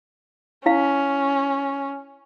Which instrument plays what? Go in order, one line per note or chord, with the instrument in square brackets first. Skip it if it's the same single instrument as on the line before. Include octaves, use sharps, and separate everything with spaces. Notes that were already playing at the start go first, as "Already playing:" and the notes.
[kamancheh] C#4 [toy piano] E4 F5